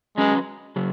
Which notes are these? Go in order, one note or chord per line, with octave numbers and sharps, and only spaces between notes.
F#3 G#3 C#4 B4
C#3 F#3